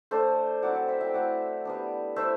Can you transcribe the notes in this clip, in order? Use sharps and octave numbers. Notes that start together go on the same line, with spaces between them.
A3 D4 A4 C5
F#3 C4 E4 D5 F#5
D5 F#5
C5 E5
E5 G5
F#3 A3 E4 D5 F#5
G3 B3 D4
A3 E4 C5 E5